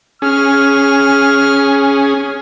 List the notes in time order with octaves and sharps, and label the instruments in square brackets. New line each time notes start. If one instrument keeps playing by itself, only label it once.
[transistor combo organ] C#4 G#4 [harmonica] F6